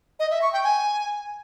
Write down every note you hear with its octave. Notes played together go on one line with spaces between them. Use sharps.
D#5
E5
C#6
G5
G#5